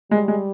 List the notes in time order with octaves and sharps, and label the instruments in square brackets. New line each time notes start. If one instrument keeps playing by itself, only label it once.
[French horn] G3 [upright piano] G#3
[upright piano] G#3